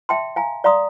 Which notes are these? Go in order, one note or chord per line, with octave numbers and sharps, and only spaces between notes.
E5 G5 A5 C6
F5 G#5 A#5
D5 F5 A#5 C6 D#6